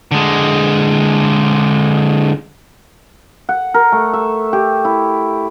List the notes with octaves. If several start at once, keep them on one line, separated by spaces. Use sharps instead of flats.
D3 G#3
F#5
A#4
A3
E5
G4
E4